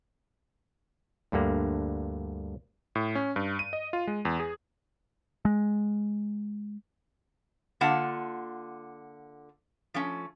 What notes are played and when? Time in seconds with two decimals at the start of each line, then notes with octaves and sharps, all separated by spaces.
1.32 D2 G2 D3 A#3
2.95 A2
3.15 C#4
3.36 G2
3.59 D#7
3.73 D#5
3.93 F4
4.07 G#3
4.25 E2
4.40 G#4
5.45 G#3
7.81 D3 A#3 F4 F#5 A5
9.94 F3 A3 C#4